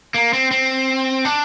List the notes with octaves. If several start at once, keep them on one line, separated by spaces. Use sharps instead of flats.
A#3
C4
C4
D4